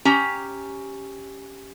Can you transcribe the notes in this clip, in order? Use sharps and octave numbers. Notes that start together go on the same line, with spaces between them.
C#4 G4 A#5